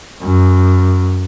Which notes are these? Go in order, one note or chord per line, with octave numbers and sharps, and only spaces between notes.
F#2